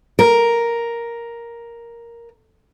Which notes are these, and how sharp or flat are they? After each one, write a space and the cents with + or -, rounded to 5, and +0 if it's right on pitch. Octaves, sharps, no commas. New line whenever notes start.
A#4 +5